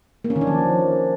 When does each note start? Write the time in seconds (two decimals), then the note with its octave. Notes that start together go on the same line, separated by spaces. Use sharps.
0.24 A#3
0.30 C#4
0.36 D#3
0.41 D4
0.47 F3